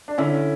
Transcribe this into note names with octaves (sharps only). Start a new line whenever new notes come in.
D4
D3 C#4 E4